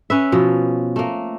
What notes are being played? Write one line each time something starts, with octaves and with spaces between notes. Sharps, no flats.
C#4 B4 E5
B2 F3
A3 A#3